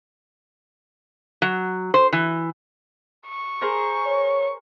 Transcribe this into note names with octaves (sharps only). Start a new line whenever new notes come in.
F#3
C5
E3
C#6
G#4 A#4 C5
C#5